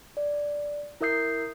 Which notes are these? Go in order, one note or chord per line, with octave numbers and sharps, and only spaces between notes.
D5
E4 A#4 E5 D#6 G6 C7